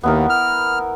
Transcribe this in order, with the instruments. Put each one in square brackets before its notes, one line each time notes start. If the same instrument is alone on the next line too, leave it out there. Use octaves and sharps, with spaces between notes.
[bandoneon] D#2 [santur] B3 E4 A#4
[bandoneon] F6